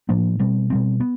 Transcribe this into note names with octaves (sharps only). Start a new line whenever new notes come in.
A2 F3 A#3 D4
B2 G3 C4
B2 G3 C4
B3